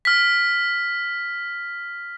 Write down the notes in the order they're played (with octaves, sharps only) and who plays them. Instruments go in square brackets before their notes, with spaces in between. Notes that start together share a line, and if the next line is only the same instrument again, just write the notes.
[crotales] F6 B6